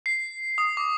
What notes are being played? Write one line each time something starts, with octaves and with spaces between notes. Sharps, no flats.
C7
D#6
D6